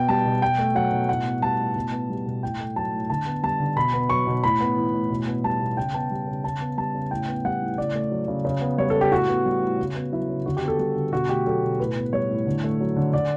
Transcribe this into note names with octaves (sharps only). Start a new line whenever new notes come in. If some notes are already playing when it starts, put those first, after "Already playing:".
Already playing: B2 B3 G5
G3 A5
B2
B2 G5
A3
F#3 F#5
B2
A2 F#5
B3
G3 A5
A2
B2
B3
G3
B2
A2 G5
A3
F#3 A5
A2
D3 A5
B3
G3 A5
D3
B2 B5
B3
F#3 C#6
B2
A2 B5
B3
E3
A2
B2
B3
G3 A5
B2
C#3 G5
B3 A5
G3
C#3
C#3 A5
B3
G3 A5
C#3
A2 G5
B3
G3 F#5
A2
C#3 D5
A3
F#3
C#3
C#3
B3
G3 C#5
A4
C#3
G4
A2 F#4
B3
G3
A2
C#3
B3
F#3 E4
C#3
D3 F#4
G4
B3
A4
G3 G4
D3
B2 F#4
A3 G4
F#3 A4
B2
A2 B4
B3
G3 C#5
A2
D3
A3
F#3
D3
D3 D5